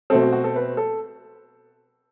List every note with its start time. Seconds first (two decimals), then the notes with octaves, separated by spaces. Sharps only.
0.10 B2 A3 C4 A4
0.22 F#4
0.33 F#4
0.44 A4
0.56 B4
0.77 A4